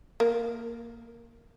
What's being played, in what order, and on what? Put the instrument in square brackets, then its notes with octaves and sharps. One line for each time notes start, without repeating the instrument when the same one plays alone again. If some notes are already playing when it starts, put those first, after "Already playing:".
[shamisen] A#3